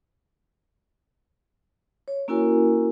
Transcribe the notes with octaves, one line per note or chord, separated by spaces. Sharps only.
C#5
A#3 C#4 E4 F#4 A#4 G#5